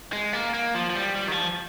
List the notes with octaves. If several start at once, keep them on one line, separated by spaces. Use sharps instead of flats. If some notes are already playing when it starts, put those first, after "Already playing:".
G#3
A#3
A#3
F3
F3
G3
G3
D#3
F3